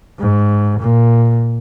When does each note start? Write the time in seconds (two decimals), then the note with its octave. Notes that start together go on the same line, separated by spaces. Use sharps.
0.20 G#2
0.80 A#2